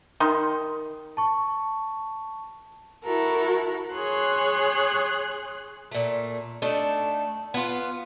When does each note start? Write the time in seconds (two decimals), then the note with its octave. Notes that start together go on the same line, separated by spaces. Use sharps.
0.20 D#3 C6
1.17 A5 C#6
3.04 E4 F#4 A4 A#4
3.93 G#4 C#5 C6 F#6
5.92 A#2 A3
6.62 A3 D4 D#4 A4
7.54 B3 F4